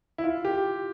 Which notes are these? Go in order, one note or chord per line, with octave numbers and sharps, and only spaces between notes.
E4
F4
G4